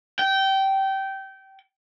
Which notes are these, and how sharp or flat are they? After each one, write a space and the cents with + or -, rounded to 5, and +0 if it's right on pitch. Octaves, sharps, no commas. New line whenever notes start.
G5 -20